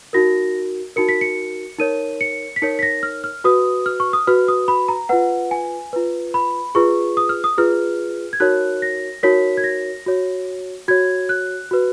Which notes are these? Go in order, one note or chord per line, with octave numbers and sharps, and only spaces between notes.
D#4 F#4 A#4 A#6
D#4 F#4 A#4 C#7
B6
C#7
D#4 A#4 C#5 D#7
C#7
B6
D#4 A#4 C#5 C#7
B6
A#6
F6
F6
F#4 B4 D#6
F6
C#6
D#6
F#4 B4 F6
D#6
B5
A#5
F4 B4 F#5
G#5
F4 B4
B5
F4 G#4 B4 C#6
D#6
F6
D#6
F4 G#4 B4 F6
G#6
D#4 F#4 A#4 C#5 F#6
A#6
D#4 F#4 A#4 C#5 B6
G#6
A#6
F#4 C#5
F#4 C#5 G#6
F#6
F#4 B4